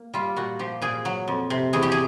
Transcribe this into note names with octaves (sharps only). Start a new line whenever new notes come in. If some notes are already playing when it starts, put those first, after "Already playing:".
Already playing: A#3
G3 F4
A#2 F#4
F3 G4
A#2 G#4
F#3
F2
C3
E2 G#4
G4
G#4